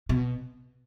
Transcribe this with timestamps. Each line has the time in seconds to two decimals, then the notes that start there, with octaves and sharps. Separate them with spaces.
0.09 B2